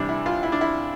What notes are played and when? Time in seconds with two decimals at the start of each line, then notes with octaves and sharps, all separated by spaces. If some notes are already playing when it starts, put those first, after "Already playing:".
Already playing: C3 E3 G3 D4
0.09 E4
0.26 F4
0.43 E4
0.52 D4
0.61 E4